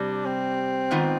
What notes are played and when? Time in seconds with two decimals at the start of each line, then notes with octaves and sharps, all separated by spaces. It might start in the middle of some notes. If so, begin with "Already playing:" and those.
Already playing: C3 G3 D4
0.25 C4
0.91 G#2 D#3 B3 F4